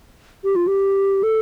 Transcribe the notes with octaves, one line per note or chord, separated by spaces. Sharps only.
G4
F4
G4
A4